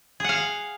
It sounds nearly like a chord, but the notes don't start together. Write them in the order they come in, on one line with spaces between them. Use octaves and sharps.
G#4 F#5 F5